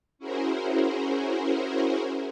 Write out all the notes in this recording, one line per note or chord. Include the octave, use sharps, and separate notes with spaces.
C#4 E4 F#4 G#4 A#4 C5